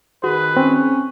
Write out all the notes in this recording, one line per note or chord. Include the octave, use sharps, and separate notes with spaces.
D#3 F#4 G#4 B4
C4 C#4